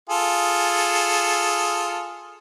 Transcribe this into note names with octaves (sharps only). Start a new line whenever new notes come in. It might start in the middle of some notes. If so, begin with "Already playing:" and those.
F4 G#4 A4